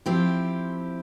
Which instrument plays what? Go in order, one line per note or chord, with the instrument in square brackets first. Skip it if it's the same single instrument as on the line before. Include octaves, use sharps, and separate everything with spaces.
[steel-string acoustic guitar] F3 C4 E4 G4